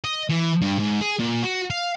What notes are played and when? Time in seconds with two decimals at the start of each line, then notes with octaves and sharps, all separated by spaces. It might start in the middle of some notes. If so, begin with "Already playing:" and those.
0.04 D#5
0.29 E3
0.62 G2
0.79 G#2
1.01 G#4
1.19 A#2
1.43 F#4
1.70 F5